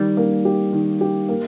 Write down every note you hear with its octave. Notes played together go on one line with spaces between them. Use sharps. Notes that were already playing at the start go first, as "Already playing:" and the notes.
Already playing: D#3 G3
A#3
G4
D#3
G4
A#3